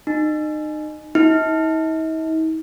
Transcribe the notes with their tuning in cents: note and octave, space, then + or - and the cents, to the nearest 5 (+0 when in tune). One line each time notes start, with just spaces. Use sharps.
D#4 -30
D#4 +45